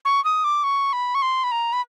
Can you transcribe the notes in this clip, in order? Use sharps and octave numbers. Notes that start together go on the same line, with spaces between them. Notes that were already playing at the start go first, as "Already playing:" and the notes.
C#6
D#6
D6
C#6
B5
C#6
C6
B5
A#5
B5